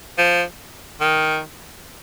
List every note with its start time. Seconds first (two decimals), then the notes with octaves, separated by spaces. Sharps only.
0.18 F3
1.01 D#3